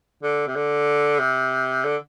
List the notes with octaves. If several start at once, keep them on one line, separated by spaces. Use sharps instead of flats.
D3
C3
D3
C3
D3